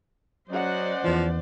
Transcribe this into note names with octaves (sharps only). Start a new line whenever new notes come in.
F#3 C#4 C5 D5 D#5 F#5
E2 E3 F3